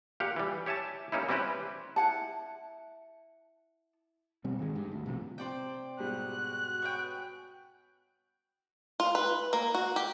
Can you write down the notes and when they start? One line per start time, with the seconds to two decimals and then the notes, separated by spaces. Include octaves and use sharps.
0.20 A#2 G4 F5 F#5
0.36 E3 G3
0.66 G4 C#5 E5 G#5 A5
1.12 G3 A#3 C#4 D#4 E4
1.29 G3 C4 C#4 E4 G4 B4
1.96 E4 F#5 A5
4.44 B2 G3 C4
4.59 G#1 D#3 G#3
4.75 G2
4.92 D2
5.06 B1 A2 C3 F3
5.38 C3 C5 D5 G5
5.99 G#2 B2 G3 F#4 F#6
6.82 B3 C#4 G5
9.00 F4
9.15 B4
9.53 A#3
9.75 F#4
9.96 G4